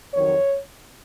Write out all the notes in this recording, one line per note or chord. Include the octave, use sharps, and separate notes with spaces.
F2 D#3 F#3 C#5